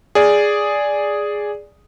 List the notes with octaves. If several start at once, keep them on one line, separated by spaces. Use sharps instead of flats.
G#4 D5